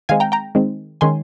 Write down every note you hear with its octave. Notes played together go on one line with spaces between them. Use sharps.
D#3 G#3 C4 F5 G#5
G5 A#5
G5 A#5
D#3 G#3 C4
D#3 G#3 C#4 G#5 C6